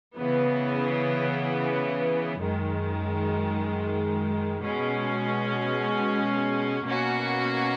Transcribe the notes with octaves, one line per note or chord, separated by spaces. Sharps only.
C#3 E3 B3
F#2 D#3 G#3
B2 G#3 C#4
B2 A#3 C#4 F#4